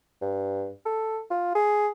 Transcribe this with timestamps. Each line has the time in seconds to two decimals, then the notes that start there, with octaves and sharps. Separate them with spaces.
0.22 G2
0.86 A4
1.30 F4
1.55 G#4